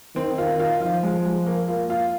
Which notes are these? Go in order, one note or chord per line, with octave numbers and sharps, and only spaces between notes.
D#3 C4
F4
F4
F3 F4
G#3
G#3
A#3
F4
F4